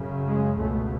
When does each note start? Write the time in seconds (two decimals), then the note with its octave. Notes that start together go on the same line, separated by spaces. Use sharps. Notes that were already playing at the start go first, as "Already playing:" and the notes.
Already playing: F#2 C#3
0.25 G#3
0.58 C#2 B2 A3